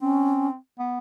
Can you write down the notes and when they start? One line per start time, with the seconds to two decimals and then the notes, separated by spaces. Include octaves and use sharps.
0.01 C4 C#4
0.79 B3